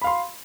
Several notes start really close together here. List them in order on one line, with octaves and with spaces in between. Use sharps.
B5 F5 C6